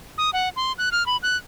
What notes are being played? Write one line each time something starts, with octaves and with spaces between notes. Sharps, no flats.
D#6
F#5
C6
F#6
F6
B5
F#6